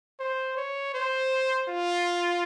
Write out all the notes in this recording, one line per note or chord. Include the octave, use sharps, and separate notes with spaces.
C5
C#5
C5
F4